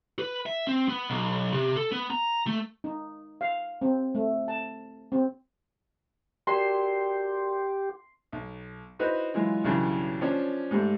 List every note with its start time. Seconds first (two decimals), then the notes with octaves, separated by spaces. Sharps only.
0.19 B4
0.46 E5
0.67 C4
0.88 B3
1.10 B1
1.54 C3
1.76 A4
1.92 B3
2.10 A#5
2.47 A3
2.84 D#4
3.41 F5
3.82 C4
4.15 A3
4.48 A5
5.12 C4
6.47 F#4 G4 A#4 D5 C6
8.32 B1
8.99 D#4 E4 F#4 B4 C5
9.34 E3 F#3 G#3 F4
9.64 B1 G2 C#3 E3 F#3
10.21 F3 C#4 D4
10.71 G#2 G3 A3